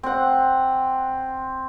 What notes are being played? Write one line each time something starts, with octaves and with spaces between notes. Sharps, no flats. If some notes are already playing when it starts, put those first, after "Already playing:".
C4 F#5